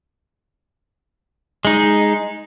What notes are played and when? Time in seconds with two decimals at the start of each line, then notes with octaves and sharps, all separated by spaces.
1.65 G#3 D#4